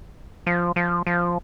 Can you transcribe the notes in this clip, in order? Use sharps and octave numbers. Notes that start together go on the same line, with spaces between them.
F3
F3
F3